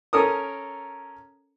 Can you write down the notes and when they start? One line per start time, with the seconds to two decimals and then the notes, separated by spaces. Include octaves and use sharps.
0.13 C#4 A4 A#4 D#6